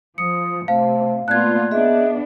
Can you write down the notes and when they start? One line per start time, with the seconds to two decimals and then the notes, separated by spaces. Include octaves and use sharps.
0.18 F3 D#6 C#7
0.68 C3 A3 C5 F5
1.28 A#2 A3 B3 F4 D5 F#6 G#6
1.71 B3 D4 G#4 D#5 E5